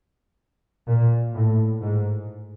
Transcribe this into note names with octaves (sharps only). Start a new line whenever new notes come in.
A#2
A2
G#2